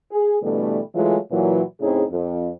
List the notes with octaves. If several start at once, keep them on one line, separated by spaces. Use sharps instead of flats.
G#4
B2 D3 E3 G3 A3
E3 F#3 G#3 A3 F4
A#2 E3 F#3
A2 C#3 C4 D#4 E4 G#4
F2